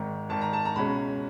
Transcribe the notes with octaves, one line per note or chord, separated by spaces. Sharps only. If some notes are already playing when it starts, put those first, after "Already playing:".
Already playing: G#1 G#2 D#3
G#1 G#2 D#3 A5
A#5
A5
A#5
C#2 B2 G#3 C#4 B5